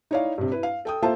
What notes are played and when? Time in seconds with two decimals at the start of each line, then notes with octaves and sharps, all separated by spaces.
0.11 D#4 E4 C#5 D5 F5
0.38 G2 C3
0.52 E4 B4
0.63 F5
0.85 A4 G5 D#6
1.02 A#3 F4 A4 C5 E5 A5